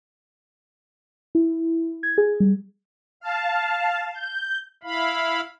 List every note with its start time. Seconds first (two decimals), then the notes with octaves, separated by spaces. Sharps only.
1.35 E4
2.03 G#6
2.18 G#4
2.40 G3
3.20 F5 A5
4.13 G6
4.83 E4 F5 B5